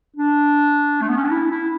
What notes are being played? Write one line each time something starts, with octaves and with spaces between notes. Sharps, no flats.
D4
A3
B3
C#4
D4
E4
E4